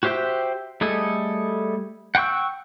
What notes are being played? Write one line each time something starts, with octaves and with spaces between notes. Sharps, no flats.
F#4 G4 C5 E5 G5
G3 A3 G#4 A4 D#5
F#5 G5 C6 C#6 E6